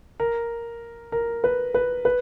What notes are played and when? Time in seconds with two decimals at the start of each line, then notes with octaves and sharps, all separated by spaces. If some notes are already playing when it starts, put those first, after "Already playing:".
0.20 A#4
1.12 A#4
1.44 B4
1.74 B4
2.05 B4